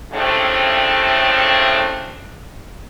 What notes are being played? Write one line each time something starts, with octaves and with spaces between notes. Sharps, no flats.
A2 C#3 G3 A3 C4 D4